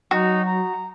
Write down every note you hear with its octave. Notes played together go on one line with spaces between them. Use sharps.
F#3 D#4 F#4
A#5